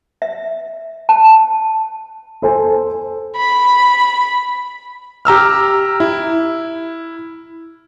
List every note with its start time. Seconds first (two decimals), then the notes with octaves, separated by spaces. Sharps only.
0.22 E5
1.09 A5
2.42 A4 C5 G#5
3.36 B5
5.25 G4 A#5 E6 F6
6.00 E4